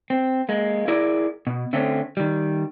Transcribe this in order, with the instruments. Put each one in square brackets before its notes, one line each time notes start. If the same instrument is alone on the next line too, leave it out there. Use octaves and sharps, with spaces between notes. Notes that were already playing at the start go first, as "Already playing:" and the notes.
[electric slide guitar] C4
G#3 A#3
E4 G#4 A#4 D5
B2
D3 A3 C4 C#4
D#3 G3